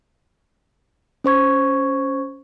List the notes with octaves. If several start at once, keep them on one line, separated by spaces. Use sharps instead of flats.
C#4 C5 C#6 G#6